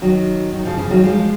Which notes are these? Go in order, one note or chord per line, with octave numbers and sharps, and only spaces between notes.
D#3 F#3
D#3 F#3
C#3 F3
C#3 F3
D#3 F#3
F3 G#3